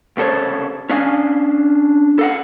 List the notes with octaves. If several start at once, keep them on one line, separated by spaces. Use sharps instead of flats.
C2 C#3 A4 C5 C#5
C#4 D4 F5 G#5
A4 F5 F#5